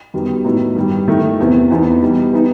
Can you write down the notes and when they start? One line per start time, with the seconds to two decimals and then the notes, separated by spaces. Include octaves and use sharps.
0.14 F#2 D#3 G3 B3
0.44 A2 F#3 B3 D#4
0.76 G2 D#3 G3
1.08 D#3 A3 E4
1.40 E2 C3 E3 B3
1.71 E2 C3 E3 B3 D#4
2.02 B2 G3 D#4
2.33 E3 B3 D#4